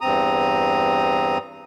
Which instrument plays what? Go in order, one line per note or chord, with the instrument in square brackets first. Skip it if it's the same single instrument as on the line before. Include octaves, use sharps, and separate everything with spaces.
[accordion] E2 G2 C4 A#5 D#6